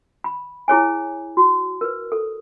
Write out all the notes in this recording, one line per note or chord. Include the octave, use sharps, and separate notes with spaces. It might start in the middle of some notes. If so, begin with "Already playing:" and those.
B5
E4 G#4 C#5 G#5
F#4
A#4 B4
A4